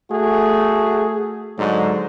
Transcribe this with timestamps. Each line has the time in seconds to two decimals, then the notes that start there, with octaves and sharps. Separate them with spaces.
0.10 A3 F#4 G#4
1.58 G#2 D3 F#3